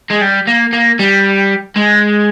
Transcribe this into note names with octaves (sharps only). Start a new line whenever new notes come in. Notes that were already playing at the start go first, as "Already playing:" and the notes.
G#3
G3
A#3
A#3
G3
G#3